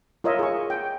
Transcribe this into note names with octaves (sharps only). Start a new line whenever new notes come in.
F4 A#4 C#5 D#5 E5
G#4 C#6
G5